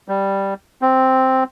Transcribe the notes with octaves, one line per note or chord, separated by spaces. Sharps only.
G3
C4